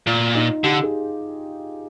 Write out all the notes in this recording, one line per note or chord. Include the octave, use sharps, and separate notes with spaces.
A#2 F4
D#4
D3 G4
G#4